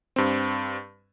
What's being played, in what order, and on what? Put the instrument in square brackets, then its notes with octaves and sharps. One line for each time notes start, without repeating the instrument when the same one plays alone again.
[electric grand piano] G2 C4